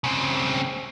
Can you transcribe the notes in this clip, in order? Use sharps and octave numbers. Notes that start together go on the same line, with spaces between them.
C#3 C4